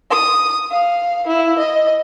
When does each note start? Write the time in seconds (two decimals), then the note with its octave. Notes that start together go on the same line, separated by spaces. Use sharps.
0.11 D#6
0.71 F5
1.27 E4
1.59 D#5